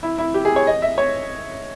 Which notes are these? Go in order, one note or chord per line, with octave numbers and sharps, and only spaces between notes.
E4
E4
G4
G#4
C#5
D#5
E5
C#5